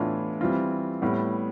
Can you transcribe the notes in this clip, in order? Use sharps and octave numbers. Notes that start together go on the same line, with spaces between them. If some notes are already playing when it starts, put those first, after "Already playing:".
Already playing: A2 E3 B3 D4 F4
E3 G3 C4 F4
A2 G3 B3